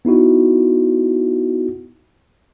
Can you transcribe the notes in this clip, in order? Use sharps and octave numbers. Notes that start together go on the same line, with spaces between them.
B3 D#4 E4 F#4